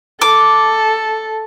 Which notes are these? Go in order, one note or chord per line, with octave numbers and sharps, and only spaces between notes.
A4 D6